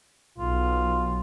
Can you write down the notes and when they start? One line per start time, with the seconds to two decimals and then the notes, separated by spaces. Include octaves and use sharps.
0.38 B1 F4